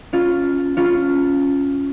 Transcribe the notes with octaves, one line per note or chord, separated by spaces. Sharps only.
C#4 F4
C#4 F4